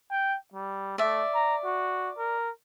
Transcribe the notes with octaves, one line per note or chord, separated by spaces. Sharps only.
G5
G3
A3 D5 E5
A#5
F#4
A#4